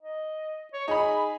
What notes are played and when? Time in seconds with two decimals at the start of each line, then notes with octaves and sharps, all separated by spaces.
0.02 D#5
0.73 C#5
0.88 D#4 G#4 B5